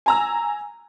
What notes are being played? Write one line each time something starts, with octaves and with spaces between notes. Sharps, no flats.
G#5 A#5 E6